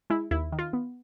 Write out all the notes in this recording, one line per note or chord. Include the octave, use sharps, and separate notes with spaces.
G#3 E4
D#2 E4
D#3
F4
B3